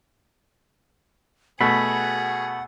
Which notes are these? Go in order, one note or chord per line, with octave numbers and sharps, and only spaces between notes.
B2 A3 F#4 G#4 F#5 B5